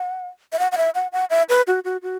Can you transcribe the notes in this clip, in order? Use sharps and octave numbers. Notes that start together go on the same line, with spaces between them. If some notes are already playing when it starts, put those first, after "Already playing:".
Already playing: F#5
E5
F#5
F#5
E5
F#5
F#5
E5
B4
F#4
F#4
F#4